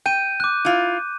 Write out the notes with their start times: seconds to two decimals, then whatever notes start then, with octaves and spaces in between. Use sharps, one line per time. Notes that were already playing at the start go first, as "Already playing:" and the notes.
0.06 G5 G6 D#7
0.40 D6 F#6
0.65 E4 F4